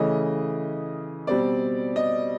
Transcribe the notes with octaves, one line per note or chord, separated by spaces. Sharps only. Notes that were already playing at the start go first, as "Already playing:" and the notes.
Already playing: C#3 E3 A3 C#4 D#5
B2 G3 C4 D5
D#5